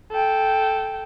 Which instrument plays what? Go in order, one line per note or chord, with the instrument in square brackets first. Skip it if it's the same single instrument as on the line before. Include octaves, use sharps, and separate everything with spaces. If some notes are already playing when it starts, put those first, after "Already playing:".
[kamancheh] A4 G5